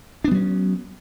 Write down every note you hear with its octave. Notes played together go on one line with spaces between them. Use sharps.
F#3 B3 C#4 D4